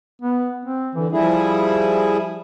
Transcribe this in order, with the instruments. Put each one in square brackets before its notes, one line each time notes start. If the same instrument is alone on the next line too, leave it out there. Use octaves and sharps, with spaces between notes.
[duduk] B3
C4
[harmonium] D3 [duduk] E3
[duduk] F3 [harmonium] G3 E4 G#4